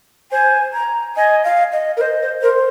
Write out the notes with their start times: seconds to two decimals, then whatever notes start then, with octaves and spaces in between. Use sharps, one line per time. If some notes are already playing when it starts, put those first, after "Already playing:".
0.31 C5 G#5
0.73 A#5
1.16 D#5 G#5
1.44 F5
1.72 D#5
1.96 A#4
2.00 C5 D#5
2.22 C5
2.42 A#4 C5